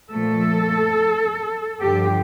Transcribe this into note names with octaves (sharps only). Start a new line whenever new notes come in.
A#2 F3 A3 A4
G2 D3 F3 G4